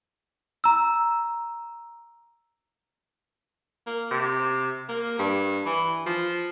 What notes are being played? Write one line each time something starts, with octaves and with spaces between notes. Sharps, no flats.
A#5 E6
A#3
C3
A#3
G2
E3
F3